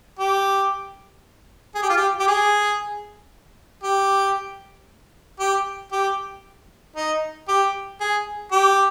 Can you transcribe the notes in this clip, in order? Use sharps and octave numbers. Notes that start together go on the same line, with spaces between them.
G4
G#4
G4
F4
G4
G4
G#4
G4
G4
G4
D#4
G4
G#4
G4